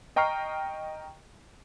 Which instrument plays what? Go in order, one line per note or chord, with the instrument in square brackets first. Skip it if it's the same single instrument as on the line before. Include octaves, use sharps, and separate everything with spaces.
[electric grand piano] D#5 G5 A#5 C#6 F6 C7